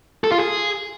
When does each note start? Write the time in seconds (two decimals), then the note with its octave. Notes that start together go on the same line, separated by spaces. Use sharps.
0.24 A4
0.32 F4
0.40 G#4